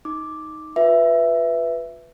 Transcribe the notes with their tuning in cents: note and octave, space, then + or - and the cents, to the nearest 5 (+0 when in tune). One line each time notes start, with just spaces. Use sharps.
D#4 +5 D6 +0
F4 +30 B4 +0 E5 +10